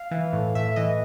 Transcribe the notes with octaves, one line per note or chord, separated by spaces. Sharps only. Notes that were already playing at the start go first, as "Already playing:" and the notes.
Already playing: F5
E3
A2
A2 E5
E3 D#5